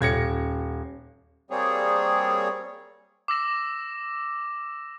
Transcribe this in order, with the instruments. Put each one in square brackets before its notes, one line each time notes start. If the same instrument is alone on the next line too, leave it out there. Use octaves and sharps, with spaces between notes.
[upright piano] D#1 G#6 A#6 C#7
[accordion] G3 A#3 C4 G#4 C#5
[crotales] D6 E6 A#6 E7